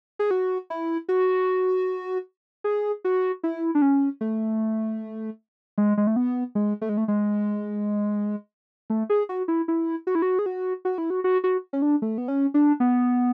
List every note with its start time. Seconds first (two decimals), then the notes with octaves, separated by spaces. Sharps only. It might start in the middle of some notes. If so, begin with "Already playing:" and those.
0.19 G#4
0.31 F#4
0.70 E4
1.09 F#4
2.64 G#4
3.05 F#4
3.43 E4
3.75 D4
3.82 C#4
4.21 A3
5.78 G#3
5.97 G#3
6.07 A3
6.16 B3
6.55 G#3
6.81 A3
6.89 G#3
6.97 A3
7.08 G#3
8.90 A3
9.10 G#4
9.29 F#4
9.48 E4
9.68 E4
10.07 F#4
10.15 E4
10.22 F#4
10.39 G#4
10.46 F#4
10.85 F#4
10.98 E4
11.10 F#4
11.24 F#4
11.44 F#4
11.73 C#4
11.82 D4
12.02 A3
12.18 B3
12.28 C#4
12.54 D4
12.80 B3